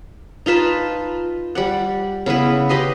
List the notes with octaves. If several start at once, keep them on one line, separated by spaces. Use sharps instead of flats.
D#4 F4 B4 A5
G3 D5 F#5
C#3 B3 E4 B4
G4 B4 D#5 C6